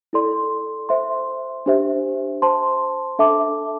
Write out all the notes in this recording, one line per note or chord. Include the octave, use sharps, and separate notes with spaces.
E4 A4 D5 C6
C5 E5 C6
D4 G4 C5 E5
C5 A5 C6
D4 A4 E5 A5 D6